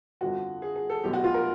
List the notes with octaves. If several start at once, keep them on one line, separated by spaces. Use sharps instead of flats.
G1 F2 D3 F3 F#4
G#4
G#4
A4
F1 E2 B2 F#3 G4
F#4
F4
A#4